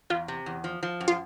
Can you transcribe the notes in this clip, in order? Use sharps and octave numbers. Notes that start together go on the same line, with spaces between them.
E2 F4
C3
E2
F3
F3
F#2
F4